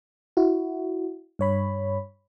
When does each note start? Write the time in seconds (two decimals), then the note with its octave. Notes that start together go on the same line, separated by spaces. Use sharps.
0.37 E4 F#4
1.39 G2 C#5 B5